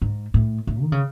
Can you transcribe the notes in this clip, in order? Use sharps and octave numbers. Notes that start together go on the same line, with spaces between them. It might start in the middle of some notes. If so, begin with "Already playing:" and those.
G#2
A2
A2
D#3
C#3